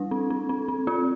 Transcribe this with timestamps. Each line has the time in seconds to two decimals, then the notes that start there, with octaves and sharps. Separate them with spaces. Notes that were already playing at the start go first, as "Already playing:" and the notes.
Already playing: G3 D4
0.11 C4
0.30 C4
0.49 C4
0.68 C4
0.87 C4 F4